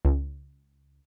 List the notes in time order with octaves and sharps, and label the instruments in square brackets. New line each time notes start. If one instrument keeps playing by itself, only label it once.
[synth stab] C#2